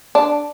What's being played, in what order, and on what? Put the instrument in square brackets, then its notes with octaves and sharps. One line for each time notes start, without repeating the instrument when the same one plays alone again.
[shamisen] D4